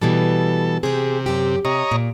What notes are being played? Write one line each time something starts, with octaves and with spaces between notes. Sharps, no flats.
B2 E3 G3 A4
C3 G4 G#4
F#2 G4
C3 C#5 D#5 A#5
A#2